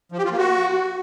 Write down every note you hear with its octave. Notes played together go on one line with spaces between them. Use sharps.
F3
G4
F4
A#3
F#4